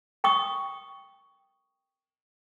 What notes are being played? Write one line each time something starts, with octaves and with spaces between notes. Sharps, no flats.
G5 C#6 D#6